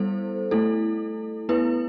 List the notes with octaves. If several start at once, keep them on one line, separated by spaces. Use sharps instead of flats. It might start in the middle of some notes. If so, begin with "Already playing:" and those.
Already playing: G3 B3 E4 A4 C5
A3 E4 A4
B3 E4 B4